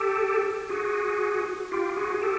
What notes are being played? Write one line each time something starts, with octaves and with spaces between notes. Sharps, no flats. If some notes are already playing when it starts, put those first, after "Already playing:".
Already playing: G4 A4
F#4 G#4
F4 G4
F#4 G#4
G#4
G4 A4